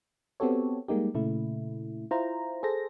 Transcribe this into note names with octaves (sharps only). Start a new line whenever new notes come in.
B3 C4 F#4 G4 A4 C#5
G3 G#3 A#3 D#4 G4
A#2 C#3 A3 E4
E4 F4 C5 A#5
G#4 A4 C5 A#6